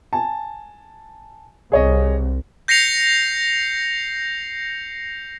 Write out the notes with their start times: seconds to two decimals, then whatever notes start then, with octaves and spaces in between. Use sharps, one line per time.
0.13 G#5 A5
1.72 C2 G#4 C#5 D#5
2.68 G6 A#6 C7 C#7 F7